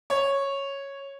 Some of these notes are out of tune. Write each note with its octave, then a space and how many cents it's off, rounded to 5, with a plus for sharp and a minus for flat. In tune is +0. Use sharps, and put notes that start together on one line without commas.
C#5 -5